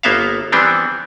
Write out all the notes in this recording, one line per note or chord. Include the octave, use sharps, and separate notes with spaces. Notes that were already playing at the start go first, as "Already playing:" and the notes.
G1 A#3 B3 E5 F5
E3 G3 B3 C4 D4